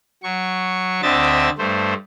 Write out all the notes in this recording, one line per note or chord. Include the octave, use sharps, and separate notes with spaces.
F#3 C#6
D2 D3 C4 D#5 E5 A6
G2 A3 C5